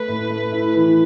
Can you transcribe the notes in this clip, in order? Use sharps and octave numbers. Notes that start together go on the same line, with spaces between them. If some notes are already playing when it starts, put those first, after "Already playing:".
Already playing: A3 B4
A2
A3
E4
E3